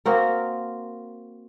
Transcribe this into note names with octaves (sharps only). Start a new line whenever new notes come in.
A#3 C4 F#4 A#4